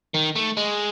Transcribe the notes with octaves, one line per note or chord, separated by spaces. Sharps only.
D#3
A3
G#3